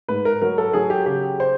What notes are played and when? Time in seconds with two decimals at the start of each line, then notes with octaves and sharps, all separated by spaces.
0.09 G#2 B4
0.25 A#4
0.41 F#3 A#4
0.58 A4
0.73 F#3 G#4
0.90 G4
1.06 C#3 G4
1.40 C5